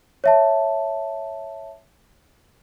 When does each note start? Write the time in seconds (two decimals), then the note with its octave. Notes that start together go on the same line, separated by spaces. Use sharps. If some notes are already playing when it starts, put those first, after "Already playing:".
0.24 C#5 E5 A5